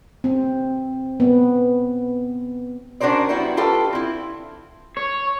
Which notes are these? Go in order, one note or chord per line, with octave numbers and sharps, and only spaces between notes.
C4
B3
C#4 D4 F#4 A#4 C5 D5
F#3 G3 B3 E4 F#4
D4 F4 G4 A4 B4
C4 E4
C#5